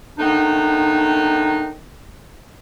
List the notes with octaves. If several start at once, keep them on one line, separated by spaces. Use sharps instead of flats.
A2 D#3 B3 D4 D#4